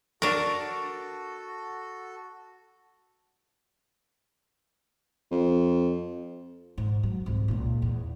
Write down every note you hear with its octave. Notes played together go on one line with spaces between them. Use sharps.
D4 F#4 A4 A#4 C#6 A6
F2
G#2
F#3
C2 G#2
C#2 A#2
E2